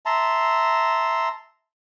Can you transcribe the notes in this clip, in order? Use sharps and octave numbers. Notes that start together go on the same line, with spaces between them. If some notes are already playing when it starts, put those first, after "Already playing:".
E5 A5 A#5 C6